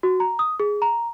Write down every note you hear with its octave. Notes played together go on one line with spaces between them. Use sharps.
F#4
A#5
D#6
G#4
A#5